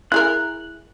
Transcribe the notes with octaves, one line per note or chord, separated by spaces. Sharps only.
E4 G#4 A#4 F#6